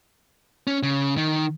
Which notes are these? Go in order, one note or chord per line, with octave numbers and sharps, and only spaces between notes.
C#4
C#3
D#3